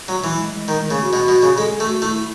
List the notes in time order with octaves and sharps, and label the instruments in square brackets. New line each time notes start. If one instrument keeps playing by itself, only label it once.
[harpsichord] F#3
[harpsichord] E3 [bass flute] F#3
[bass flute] G#3
G#3
[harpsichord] D#3
[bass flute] G#3
[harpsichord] C#3 [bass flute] A3
[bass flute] F#4
[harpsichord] B2
B2
C#3
[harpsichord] G#3 [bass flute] A4
[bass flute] A4
[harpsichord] A3
[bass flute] F#4
[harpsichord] A3 [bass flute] E4